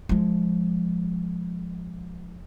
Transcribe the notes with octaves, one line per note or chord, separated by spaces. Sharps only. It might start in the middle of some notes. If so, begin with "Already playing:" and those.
F3 G#3